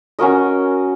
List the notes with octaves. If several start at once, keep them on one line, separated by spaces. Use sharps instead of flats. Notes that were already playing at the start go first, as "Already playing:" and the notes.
C#4 F#4 A#4 D#5